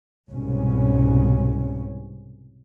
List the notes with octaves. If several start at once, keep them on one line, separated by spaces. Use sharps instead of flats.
C2 G#2 B2 C#4